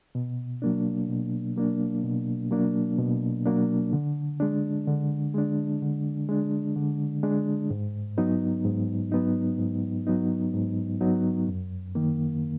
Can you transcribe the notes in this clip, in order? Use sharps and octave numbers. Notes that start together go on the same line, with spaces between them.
B2
F#3 A#3 D4
B2
F#3 A#3 D4
B2
F#3 A#3 D4
B2
F#3 A#3 D4
D3
G#3 D4
D3
G#3 D4
D3
G#3 D4
D3
G#3 D4
G#2
F#3 B3 D#4
G#2
F#3 B3 D#4
G#2
F#3 B3 D#4
G#2
F#3 B3 D#4
F#2
D#3 A#3